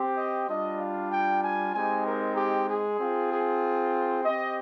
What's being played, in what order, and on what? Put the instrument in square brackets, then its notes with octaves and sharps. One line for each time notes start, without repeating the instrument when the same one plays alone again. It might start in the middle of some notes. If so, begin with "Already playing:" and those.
Already playing: [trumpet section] C4 G4
D#5
G3 D4 F4 D#5
F5
G5
G#5
G#3 C4 D#4 G4 G#5
A#4
G4
G#4
C4 F4
G#4
C4 G4 D#5